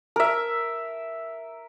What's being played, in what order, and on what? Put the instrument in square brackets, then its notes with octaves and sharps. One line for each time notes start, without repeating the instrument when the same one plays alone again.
[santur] A#4 E5